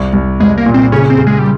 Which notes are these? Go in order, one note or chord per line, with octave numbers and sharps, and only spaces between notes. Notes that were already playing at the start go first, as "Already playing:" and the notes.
Already playing: C2
C2
C2 G#3
A#3
A#2
C4
C#3 C#4
C4
C#3
G#3
G3